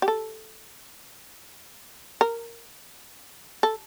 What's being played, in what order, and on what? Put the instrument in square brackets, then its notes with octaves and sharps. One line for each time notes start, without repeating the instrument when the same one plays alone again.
[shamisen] G4
A4
A#4
A4